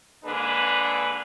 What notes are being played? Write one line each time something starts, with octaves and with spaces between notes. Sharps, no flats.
G#2 D3 A#3 D4 G#4 B4